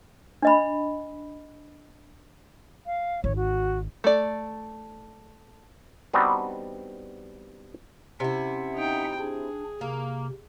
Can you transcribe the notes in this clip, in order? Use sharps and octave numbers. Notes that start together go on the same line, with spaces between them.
D4 D#5 B5
F5
G#1 C#5
F#4
A3 D5
G3 B3 C4 D4 D#4 F#4
C3 C#4 E4 E5 F#5
D#4 G5
D4 G#4
C3 A#3